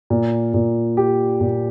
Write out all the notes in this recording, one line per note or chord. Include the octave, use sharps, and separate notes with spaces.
A#2
A#2
G4
A#2